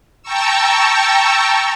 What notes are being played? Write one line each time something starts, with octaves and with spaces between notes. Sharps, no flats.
G5 A5 A#5 C#6 E6